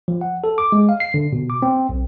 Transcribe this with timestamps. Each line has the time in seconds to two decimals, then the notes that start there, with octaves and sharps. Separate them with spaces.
0.08 F3
0.21 F#5
0.44 A4
0.58 D6
0.72 G#3
0.89 F5
1.00 C7
1.14 D3
1.33 B2
1.50 D6
1.62 C4
1.89 B1